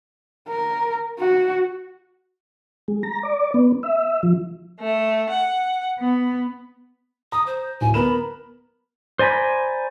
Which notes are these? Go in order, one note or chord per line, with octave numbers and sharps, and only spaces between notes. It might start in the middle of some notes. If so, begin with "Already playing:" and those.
A#4
F#4
G#3
A#5
D5
B3
E5
F3
A3
F#5
B3
A#5 D#6
C5
D1 G#5
B3 A#4 B5 E7
C5 D5 G#5 A#5 B5